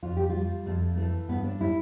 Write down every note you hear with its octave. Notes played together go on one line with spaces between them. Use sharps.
F2 F4
G4
G3 F4
F2 A3
E3 A3
G2 B3
D4
G3 E4